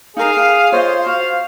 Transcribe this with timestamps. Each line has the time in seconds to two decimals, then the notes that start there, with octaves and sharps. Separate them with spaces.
0.17 D#4 G#4 A#4 F5
0.37 G5
0.72 F4 C5 C#5 D#5 F5
1.06 F#4 F5